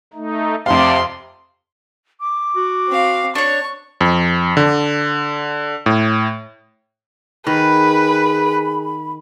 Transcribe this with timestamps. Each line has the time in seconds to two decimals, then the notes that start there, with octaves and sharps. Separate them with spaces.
0.14 A3 D#4
0.66 F2 C3 D5 F5 C6
2.20 D6
2.56 F#4
2.88 C4 F5
3.35 D4 C#5 C#6
4.01 F2
4.57 D3
5.86 A2
7.47 D#3 G#4 B4 B5